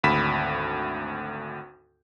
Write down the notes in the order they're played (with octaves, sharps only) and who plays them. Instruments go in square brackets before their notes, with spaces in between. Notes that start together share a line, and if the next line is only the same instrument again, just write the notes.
[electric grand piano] G#1 D2 B5 B6 E7